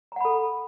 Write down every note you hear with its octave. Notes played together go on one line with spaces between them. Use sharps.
A4 F#5 A#5 B5